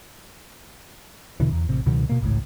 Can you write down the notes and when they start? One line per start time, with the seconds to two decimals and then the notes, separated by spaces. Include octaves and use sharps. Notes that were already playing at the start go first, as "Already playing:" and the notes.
1.40 E1 B2 D3 E3
1.52 E2
1.69 A1 C3
1.86 C#2 B2 D#3 F#3
2.09 B2 A#3
2.21 G#1 C#2 A2